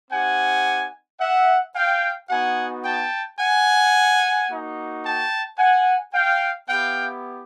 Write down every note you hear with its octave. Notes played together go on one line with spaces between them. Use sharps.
C4 D#4 G4 F#5 G#5
E5 F#5
F5 G5
B3 D#4 F#4 F#5 G#5
G5 A5
F#5 G#5
A#3 D#4 F#4
G5 A5
F#5 G#5
F5 G5
B3 E4 G4 F5 G5